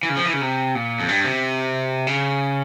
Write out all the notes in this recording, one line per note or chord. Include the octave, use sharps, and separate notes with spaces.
E3
C#3
F3
E3
C#3
C3
A#2
F2
G2
C3
C#3